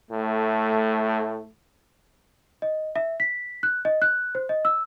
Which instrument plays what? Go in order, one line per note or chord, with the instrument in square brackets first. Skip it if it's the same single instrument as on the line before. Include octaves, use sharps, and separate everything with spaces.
[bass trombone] A2 [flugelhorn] A3
[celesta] D#5
E5
B6
F#6
D#5
F#6
C5
D#5
E6